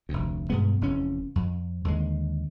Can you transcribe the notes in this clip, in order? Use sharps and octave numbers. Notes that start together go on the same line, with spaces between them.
F1 D2
G2 B2 G#3 B3
F1 E2 C#4
F2
D#2 D3 G#3